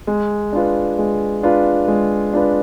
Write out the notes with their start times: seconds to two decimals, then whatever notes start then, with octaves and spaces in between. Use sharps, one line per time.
0.07 G#3
0.53 D4 F4 B4
0.99 G#3
1.43 D4 F4 B4
1.88 G#3
2.33 D4 F4 B4